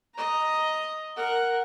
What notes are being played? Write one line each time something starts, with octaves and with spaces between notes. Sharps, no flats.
D#5 A#5
A#4 F#5